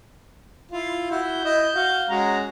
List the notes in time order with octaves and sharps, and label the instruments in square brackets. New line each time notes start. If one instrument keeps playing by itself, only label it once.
[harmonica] E4 F4
[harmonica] E4 F#4 [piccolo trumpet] G6
[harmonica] E4 D#5 E5
F#4 F5
[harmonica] G#3 C#4 F#4 [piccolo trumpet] A#5